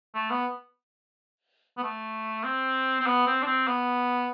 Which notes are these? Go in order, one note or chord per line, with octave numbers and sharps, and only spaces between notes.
A3
B3
B3
A3
C4
C4
B3
C4
D4
C4
B3